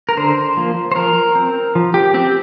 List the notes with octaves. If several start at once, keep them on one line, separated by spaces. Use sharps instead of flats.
A#4
D3 C5
F3 A#3
C5
F3 A#4
C4
F3
G4
C4 G4